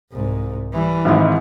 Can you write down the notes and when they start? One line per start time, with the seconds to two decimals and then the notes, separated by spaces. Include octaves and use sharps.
0.12 C2 G#2
0.73 E3 G3
1.05 G#1 G#2 E4